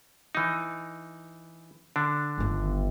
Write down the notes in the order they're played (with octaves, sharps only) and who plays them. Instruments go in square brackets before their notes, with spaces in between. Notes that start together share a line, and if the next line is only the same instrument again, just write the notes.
[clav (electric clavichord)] E3 D#4
D3 D4
[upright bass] G1 D#3